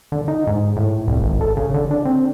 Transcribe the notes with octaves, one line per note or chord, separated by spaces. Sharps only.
D3
D#4
G#2
A2
C2
G#1
A4
C#3
D3
D4
C4